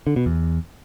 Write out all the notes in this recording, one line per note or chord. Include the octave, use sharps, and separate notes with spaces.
D3
B2
E2